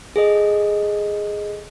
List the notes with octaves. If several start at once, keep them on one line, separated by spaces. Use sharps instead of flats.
G#4 A4 D#5